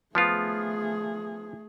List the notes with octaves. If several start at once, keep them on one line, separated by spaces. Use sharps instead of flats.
F3 A3 B3 F4 G#4